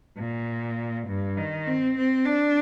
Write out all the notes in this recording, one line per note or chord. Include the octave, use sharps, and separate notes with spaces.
A#2
G2
D#3
C4
C4
D4